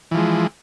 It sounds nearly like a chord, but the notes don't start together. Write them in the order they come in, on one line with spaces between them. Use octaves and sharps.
E3 F3 G#3